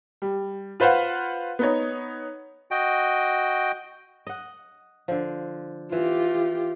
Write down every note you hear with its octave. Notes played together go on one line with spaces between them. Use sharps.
G3
F4 B4 C5 F5 F#5
B3 D#4 C#5
F#4 D#5 G5
D#5 F#5
D3 F3
E3 F4 G4